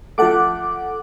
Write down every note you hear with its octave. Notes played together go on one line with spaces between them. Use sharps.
F3 A3 A4 F#5 D6